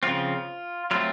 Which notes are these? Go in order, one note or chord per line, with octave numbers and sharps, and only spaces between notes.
C#3 F3 C4 F4
F#3 A3 C4 F4